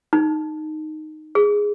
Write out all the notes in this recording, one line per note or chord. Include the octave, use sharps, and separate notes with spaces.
D#4
G#4